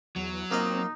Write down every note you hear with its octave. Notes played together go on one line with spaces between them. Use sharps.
E2 F#3
A#3 C4 D#4 F4 D#5